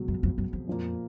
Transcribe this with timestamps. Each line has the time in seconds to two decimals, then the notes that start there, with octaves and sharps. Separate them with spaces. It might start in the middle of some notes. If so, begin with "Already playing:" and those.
Already playing: C#2 B2 F#3
0.08 F#2
0.23 F2
0.38 F#2
0.53 F2
0.68 A#2 F3 A#3